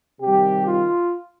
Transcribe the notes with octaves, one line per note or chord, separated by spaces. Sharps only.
C3 D#3 G3 G4
F4